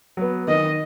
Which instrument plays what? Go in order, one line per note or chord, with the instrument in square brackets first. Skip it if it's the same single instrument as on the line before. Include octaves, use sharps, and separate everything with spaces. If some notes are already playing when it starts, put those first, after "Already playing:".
[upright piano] F#3 B3
[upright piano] D#3 [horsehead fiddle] D#5